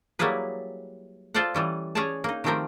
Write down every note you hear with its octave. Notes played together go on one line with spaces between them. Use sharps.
F#3 G3 A#3 E4 G#4 B4
F4 A4 C5 D5 F5 F#5
E3 G3 C#4
C#4 G#4 C#5 D5 F#5 A5
A#3 D#4
D#3 F3 A3 C4 G4 A#4